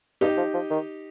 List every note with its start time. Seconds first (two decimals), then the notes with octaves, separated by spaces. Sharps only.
0.21 G2 D#4 G4
0.37 F3
0.54 F3
0.71 D#3